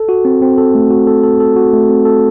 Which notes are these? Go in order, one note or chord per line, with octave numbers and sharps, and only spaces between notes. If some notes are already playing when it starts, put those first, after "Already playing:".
Already playing: A4
F#4
C4
C4
A4
A3
F#4
A4
A4
A4
F#4
A3
C4
A4